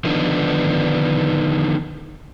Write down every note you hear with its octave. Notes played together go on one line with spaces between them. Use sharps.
D3 D#3 F3 B3 D4 D#4